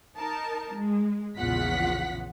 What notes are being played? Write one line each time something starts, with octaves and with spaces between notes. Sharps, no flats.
D#4 A#4 A5
G#3
A#1 E2 C#3 F4 F#5 B6